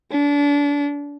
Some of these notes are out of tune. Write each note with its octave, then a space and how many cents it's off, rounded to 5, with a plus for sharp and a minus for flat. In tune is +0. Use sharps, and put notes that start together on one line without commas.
D4 -30